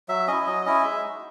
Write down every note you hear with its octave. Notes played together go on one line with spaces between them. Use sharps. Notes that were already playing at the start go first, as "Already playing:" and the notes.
F#3 E5
C#4 E4 D#5
F#3 D#5
C#4 E4 D#5
G#3 E5
D#4 F#4